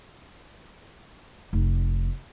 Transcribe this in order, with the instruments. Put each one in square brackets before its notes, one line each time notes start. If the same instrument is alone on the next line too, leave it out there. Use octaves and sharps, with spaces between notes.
[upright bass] F1 D#4